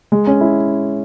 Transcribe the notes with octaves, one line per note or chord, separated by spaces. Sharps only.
G#3
C#4
E4